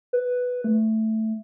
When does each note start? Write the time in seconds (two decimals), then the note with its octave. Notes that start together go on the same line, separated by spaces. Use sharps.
0.13 B4
0.64 A3